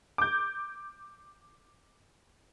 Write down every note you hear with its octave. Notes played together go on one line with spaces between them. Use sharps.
D6 G6